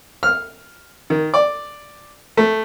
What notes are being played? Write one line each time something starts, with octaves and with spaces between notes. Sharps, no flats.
F6
D#3
D5
A3